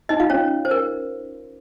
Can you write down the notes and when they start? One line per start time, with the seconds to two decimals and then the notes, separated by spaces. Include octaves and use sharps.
0.09 D#4 D#5
0.20 F4 F5
0.30 C#4 C#5
0.65 C5
0.71 A#4